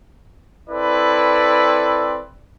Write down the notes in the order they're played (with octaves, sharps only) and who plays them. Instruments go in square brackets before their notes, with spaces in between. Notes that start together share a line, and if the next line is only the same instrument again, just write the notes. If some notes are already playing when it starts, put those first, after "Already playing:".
[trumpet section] C4 E4 A4 B4 D5